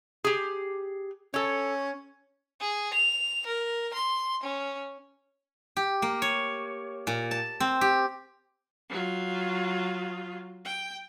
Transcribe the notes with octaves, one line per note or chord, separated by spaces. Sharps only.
G4 G#4
C#4 A4 C#5
G#4
F7
A#4
C6
C#4
G4
A#3
C#5
A#2
A5
C4
G4
F#3 F4
G5